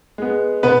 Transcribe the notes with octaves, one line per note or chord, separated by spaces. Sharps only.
G#3 B3
B2 B3 B4